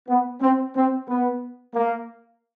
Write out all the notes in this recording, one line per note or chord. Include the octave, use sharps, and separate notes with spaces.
B3
C4
C4
B3
A#3